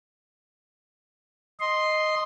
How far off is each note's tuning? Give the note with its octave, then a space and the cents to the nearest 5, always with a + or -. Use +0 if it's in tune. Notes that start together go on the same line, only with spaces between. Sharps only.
D#5 +0 C6 +0